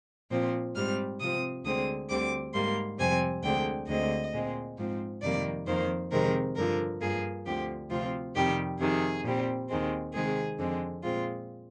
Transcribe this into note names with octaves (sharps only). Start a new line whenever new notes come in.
A#2 F3 C4
G#2 G3 C4 F6
C3 F3 C4 D#6
D2 D3 G#3 C4 D#6
D2 D3 G3 C4 D6
G#2 G3 A#3 C6
F2 C3 G3 C4 G#5
D2 D3 G#3 C4 G5
D2 D3 G#3 C4 D#5
A#2 G#3 C4
G#2 F3 C4
F2 C3 D#3 G3 A#3 D5
F2 D#3 A#3 C5
F2 C3 D#3 G#3 C4 A#4
G2 D3 F3 A#4
G2 F3 A#3 G#4
D2 D3 F3 C4 G4
D2 C3 F3 C4 F4
F2 C3 D#3 G3 G4
F2 C3 D#3 G#4
A#2 G3 C4
D#2 D#3 G#3 C4
C3 D#3 G#3 C4 G#4
F2 D3 G#3 C4
A#2 G#3 C4 F4